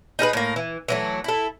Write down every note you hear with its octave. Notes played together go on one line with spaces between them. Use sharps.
D#4 G#4 A#4 B4
A2 A#3
E3
E3 F#3 A3
E4 A4